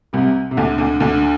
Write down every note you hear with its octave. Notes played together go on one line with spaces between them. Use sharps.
C2 C3
C3
D2 D3
D2 D3
D2 D3